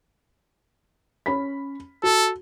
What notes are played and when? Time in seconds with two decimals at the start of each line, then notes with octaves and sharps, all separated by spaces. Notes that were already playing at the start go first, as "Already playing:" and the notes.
1.26 C#4 B5 B6
2.03 F#4 A4